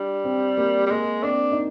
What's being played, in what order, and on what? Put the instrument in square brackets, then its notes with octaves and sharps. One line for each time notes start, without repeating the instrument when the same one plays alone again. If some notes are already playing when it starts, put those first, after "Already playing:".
Already playing: [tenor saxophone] G3 [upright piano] D4
[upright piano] C4
A#3
[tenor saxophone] G3
[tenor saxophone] G#3 [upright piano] A#3
[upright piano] C4 [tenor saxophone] D4
[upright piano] D#4